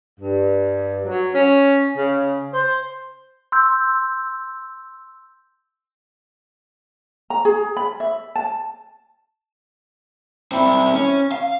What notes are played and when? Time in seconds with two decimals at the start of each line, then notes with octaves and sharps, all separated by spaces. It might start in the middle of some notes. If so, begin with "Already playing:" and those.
0.19 G2
1.05 F#3
1.34 C#4
1.96 C#3
2.53 C5
3.52 C6 E6 G6
7.30 A#5
7.45 G#4
7.77 B5
8.00 E5
8.36 A5
10.52 C4 E4
10.95 C#4
11.32 F5